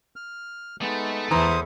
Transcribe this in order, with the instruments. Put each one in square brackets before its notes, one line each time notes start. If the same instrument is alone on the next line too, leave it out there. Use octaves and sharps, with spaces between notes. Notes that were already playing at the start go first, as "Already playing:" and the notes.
[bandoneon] F6
[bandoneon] G#3 B3 [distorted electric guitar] A3 [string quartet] D#4
[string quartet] E2 E4 A4 [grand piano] E3 A#5 [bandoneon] C5 D#6